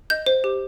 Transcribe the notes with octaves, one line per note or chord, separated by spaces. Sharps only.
D#5 G6
C5
G4